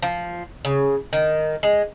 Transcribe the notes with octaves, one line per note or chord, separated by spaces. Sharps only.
F3
C#3
D#3
G#3